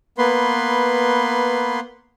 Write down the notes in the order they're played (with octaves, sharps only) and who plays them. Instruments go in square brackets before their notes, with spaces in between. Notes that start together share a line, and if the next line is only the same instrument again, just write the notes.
[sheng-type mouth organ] A#3 B3 B4 C6